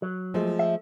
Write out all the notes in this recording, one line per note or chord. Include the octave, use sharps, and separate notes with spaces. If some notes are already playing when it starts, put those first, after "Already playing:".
F#3
F3 G#3 A3
E5